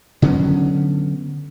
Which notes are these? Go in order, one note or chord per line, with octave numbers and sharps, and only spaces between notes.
D3 F#3 B3 C#4